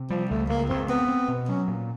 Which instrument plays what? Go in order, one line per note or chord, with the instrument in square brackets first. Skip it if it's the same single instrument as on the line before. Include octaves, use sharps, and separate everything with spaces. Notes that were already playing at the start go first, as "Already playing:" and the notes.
Already playing: [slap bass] C3
[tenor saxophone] F3 [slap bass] G3
[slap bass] C#2 [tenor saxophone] A3
[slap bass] C#2 [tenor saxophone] A#3
[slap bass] C#2 [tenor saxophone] C4
[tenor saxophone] B3 [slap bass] C4
[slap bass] C4
B2
[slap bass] F#3 [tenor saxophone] C#4
[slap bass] A#2